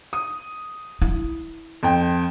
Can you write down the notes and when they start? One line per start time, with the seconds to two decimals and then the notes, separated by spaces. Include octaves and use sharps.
0.13 D#6
1.02 E4
1.83 F2 G5